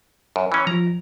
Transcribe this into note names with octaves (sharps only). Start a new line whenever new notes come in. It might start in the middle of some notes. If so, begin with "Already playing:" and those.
F#2
E3 C#4
F3 F4 A#5